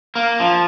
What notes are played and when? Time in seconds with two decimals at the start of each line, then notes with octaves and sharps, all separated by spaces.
0.16 A#3
0.40 F3